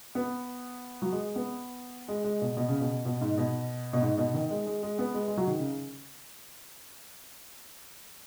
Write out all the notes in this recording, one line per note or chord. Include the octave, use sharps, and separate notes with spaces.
B3
F#3
G#3
B3
G#3
G#3
B2
B2
C#3
B2
B2
G#2
B2
B2
G#2
B2
D#3
G#3
G#3
G#3
B3
G#3
G#3
F#3
D#3
C#3